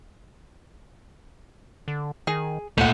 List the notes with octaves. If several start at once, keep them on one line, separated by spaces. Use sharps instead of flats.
D3
D#3 G#4
D2 A#2 A3 G4 F#5